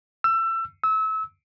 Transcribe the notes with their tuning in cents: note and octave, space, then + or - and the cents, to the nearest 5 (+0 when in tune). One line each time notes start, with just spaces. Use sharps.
E6 +25
E6 -30